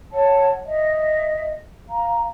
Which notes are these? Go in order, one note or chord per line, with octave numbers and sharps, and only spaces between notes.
C#5 F#5 A5
D#5 E5
F5 A#5